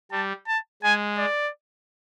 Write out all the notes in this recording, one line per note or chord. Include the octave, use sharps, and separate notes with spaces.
G3 A5
A5
G#3 G#5
D5